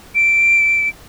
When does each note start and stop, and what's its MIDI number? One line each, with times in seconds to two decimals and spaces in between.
0.15 0.89 98